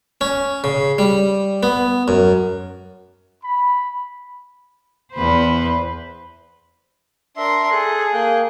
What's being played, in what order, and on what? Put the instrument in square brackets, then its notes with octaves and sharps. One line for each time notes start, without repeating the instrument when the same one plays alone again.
[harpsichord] C#4
C#3
G3
B3
F#2
[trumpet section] B5
[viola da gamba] E2 B4 C5
[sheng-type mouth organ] D4 E5 [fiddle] A#4 C6
[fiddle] G#4 [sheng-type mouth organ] A4 F#6
[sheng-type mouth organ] A#3 G5 F#6